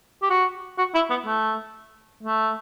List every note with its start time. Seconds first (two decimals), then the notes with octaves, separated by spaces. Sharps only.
0.22 G4
0.30 F#4
0.78 F#4
0.94 E4
1.10 B3
1.26 A3
2.23 A3